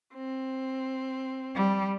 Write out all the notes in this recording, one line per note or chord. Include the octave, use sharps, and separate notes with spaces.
C4
G3